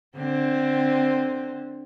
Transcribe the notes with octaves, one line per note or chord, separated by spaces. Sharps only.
D3 C4